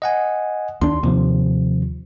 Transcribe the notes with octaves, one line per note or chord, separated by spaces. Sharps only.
D#5 F#5 G#5
D#2 D4 C6
D#2 C3 F3